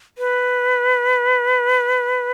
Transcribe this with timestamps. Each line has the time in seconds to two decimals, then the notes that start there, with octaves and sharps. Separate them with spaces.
0.18 B4